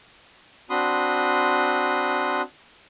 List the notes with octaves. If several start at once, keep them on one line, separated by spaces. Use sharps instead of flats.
C4 D4 F#4 B5 C6 D#6